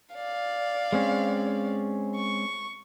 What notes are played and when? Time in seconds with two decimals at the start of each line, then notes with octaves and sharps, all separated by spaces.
0.15 D5 F5
0.93 G#3 C4 C#4
2.16 C#6